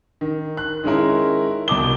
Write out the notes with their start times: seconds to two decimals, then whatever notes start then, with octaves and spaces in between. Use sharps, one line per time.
0.21 D#3
0.57 F#6
0.84 D#3 G#3 C#4 E4 A#4
1.68 C2 B2 D6 G7